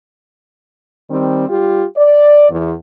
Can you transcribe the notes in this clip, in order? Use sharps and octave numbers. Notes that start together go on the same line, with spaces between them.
D#3 G3 C4
G3 F4 G4
D5
E2